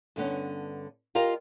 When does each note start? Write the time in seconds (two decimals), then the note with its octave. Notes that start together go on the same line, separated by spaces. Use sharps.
0.16 G2 D3 B3 C#4
1.15 F4 G4 A#4 D#5 F5